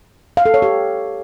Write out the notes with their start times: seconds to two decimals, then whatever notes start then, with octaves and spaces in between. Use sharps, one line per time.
0.37 F5
0.46 A4
0.54 C#5
0.62 G4